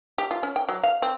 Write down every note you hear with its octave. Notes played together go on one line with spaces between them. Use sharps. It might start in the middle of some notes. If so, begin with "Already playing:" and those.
G4
F4
C#4
G5
F#3
F5
C4